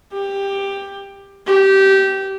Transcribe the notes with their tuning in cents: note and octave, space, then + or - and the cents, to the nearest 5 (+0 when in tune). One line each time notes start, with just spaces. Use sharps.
G4 +10
G4 -15